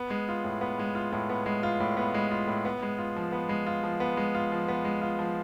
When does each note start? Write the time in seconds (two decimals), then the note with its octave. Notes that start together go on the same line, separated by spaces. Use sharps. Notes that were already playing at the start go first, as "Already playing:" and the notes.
Already playing: B3
0.10 G#3
0.28 F4
0.44 A2
0.61 B3
0.79 G#3
0.95 F4
1.12 A2
1.30 B3
1.46 G#3
1.63 F4
1.80 A2
1.97 B3
2.14 G#3
2.31 F4
2.48 A2
2.65 B3
2.82 G#3
2.98 F4
3.16 F3
3.32 B3
3.49 G#3
3.66 F4
3.83 F3
4.00 B3
4.17 G#3
4.35 F4
4.52 F3
4.68 B3
4.85 G#3
5.02 F4
5.19 F3